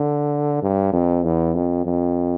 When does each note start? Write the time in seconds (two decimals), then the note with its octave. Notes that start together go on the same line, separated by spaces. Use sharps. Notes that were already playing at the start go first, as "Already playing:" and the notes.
Already playing: D3
0.63 G2
0.93 F2
1.24 E2
1.55 F2
1.85 F2